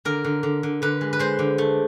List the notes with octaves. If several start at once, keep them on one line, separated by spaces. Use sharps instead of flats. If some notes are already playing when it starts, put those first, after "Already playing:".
D3 A#4
D3
D3
D3
D3 B4
G#3
B4
G#3 C5
D3
A3